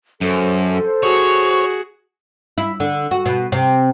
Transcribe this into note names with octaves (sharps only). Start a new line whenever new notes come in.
F#2 A4 C5
F#4 G#4 C#5
E4
D3
F#4
B2
C3